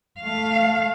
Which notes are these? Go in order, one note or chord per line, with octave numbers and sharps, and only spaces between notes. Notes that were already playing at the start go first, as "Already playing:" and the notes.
A3 F5